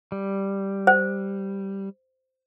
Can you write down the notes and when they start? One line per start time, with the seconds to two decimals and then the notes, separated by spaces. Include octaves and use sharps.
0.12 G3
0.87 C5